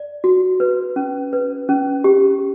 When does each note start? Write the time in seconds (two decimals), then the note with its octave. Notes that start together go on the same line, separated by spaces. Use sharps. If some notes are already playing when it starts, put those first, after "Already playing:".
Already playing: D5
0.24 F#4
0.60 B4
0.96 C#4
1.33 B4
1.69 C#4
2.04 G4